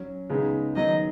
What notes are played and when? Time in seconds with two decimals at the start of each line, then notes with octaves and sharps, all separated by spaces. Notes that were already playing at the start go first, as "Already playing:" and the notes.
Already playing: F#3 C#4
0.30 C#3 G#3 B3 D#4
0.75 D#3 F#3 B3 D#4 D#5